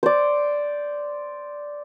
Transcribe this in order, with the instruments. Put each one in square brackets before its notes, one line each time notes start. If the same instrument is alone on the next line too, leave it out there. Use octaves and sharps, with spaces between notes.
[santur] C5 D5